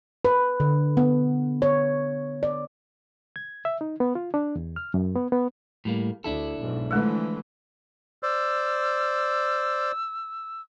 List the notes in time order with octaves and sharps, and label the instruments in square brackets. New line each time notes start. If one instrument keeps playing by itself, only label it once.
[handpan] B4
D3
B3
C#5
D5
[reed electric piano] G#6
E5
D#4
B3
F4
D4
E2
F6
F#2
B3
B3
[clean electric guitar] A2 G3 A#3
[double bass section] D2 [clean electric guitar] D4 E4 A4
[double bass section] B1 G#2
[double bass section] D3 E3 F3 [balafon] G#3 A3
[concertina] C5 D5 [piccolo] E6